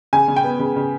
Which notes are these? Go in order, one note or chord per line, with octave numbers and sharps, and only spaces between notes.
C#3 G#5
C#3
G5
B3
C#3
C#3